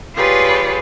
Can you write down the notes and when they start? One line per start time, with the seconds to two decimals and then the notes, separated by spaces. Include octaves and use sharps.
0.14 F4 G4 G#4 B4 C#5 D5